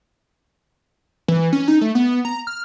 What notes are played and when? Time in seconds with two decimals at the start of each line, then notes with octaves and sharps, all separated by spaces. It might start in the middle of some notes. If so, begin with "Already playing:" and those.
1.28 E3
1.53 C#4
1.68 D#4
1.81 A3
1.95 B3
2.25 A#5
2.47 F6